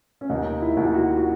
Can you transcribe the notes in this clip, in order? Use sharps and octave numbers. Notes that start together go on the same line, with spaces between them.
C#4
D#2 D#4
E4
D#2
E4
F#4
F#4